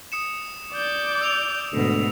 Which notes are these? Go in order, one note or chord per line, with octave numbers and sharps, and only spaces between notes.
D#6 C#7 E7
D5 G6
E6 D7 F7
D2 G#2 B2